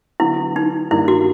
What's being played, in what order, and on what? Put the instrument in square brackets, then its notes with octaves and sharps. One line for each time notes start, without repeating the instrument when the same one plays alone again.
[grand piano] D3 F#3 B3 [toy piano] E4
[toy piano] D#4
[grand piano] G2 D#3 G3 A#3 D#4 [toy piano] E4
[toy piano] F#4